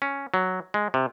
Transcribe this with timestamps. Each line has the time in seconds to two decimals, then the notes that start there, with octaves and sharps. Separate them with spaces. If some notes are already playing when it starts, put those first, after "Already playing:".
0.02 C#4
0.34 F#3
0.74 G#3
0.94 C3